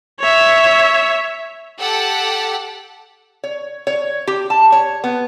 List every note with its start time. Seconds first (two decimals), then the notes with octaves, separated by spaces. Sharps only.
0.20 C#5 E5
1.78 G4 A4 F#5
3.44 C#5
3.87 C#5
4.27 G4
4.50 A5
4.72 C#5
5.04 B3